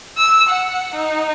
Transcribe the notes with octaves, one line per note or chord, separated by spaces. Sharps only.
E6
F#5
D#4